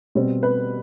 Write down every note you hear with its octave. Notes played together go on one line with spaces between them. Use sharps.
B2 G3 C4
B4